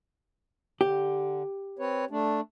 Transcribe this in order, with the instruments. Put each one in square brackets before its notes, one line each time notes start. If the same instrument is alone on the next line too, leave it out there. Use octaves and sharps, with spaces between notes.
[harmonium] D3 [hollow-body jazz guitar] G4
[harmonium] C4 B4 C#5
A3 D4